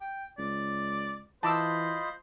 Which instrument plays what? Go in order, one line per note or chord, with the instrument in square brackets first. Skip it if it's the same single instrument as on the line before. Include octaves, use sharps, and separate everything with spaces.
[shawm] G5
[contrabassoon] C#2 [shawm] D5
[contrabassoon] E3 [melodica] F4 D#5 B5 [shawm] C5 [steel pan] A5 D6 E6